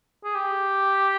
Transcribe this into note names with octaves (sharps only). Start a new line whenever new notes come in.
G#4
G4